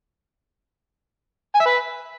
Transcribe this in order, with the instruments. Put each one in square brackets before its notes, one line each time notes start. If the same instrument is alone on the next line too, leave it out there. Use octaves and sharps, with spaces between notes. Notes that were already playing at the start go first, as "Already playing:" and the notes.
[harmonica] G#5
E5
B4